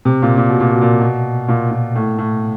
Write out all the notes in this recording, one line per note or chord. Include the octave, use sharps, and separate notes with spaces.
C3
A#2
A#2
B2
A#2
B2
A#2
B2
A#2
A#2
A2
A2